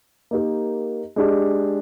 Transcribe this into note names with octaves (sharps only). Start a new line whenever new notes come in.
A#3 D#4 G4 A#4
G#3 D4 G4